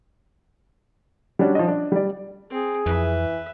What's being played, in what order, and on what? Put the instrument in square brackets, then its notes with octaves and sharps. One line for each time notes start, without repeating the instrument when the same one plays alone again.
[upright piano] G3 C#4 D4 F#4
F3 D#5
D4
G3 D5
[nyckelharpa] C4 [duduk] G#4
[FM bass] F2 [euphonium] E3 [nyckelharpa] B4 E5